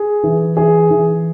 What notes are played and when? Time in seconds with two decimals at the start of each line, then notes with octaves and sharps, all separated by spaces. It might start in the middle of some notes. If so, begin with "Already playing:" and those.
Already playing: G#4
0.23 E3
0.57 E3 G#4
0.91 E3